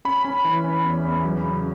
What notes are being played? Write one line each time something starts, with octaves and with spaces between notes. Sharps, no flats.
C#4 B5
C#4
E3
C#4
E2
E2
F#3
C#3